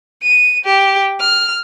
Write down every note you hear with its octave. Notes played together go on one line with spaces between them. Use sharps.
D#7
G4
F6